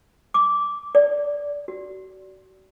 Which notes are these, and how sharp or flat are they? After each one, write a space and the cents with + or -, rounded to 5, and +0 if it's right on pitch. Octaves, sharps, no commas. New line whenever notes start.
D6 -10
D5 -20
F#4 +35